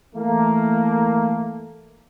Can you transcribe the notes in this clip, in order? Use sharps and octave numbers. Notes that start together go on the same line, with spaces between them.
E3 A3 A#3